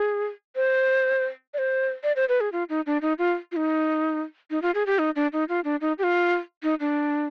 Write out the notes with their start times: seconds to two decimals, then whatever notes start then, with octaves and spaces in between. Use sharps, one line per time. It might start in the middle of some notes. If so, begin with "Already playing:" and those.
Already playing: G#4
0.56 C5
1.54 D5
1.58 C5
2.03 D5
2.16 C5
2.29 B4
2.41 G#4
2.52 F4
2.69 D#4
2.86 D4
3.02 D#4
3.19 F4
3.52 F4
3.56 D#4
4.50 D#4
4.62 F4
4.75 G#4
4.87 G4
4.99 D#4
5.16 D4
5.33 D#4
5.49 F4
5.64 D4
5.81 D#4
5.99 G4
6.03 F4
6.63 D#4
6.80 D4